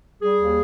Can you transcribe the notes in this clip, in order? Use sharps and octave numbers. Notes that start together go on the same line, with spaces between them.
G3 G#4
D#2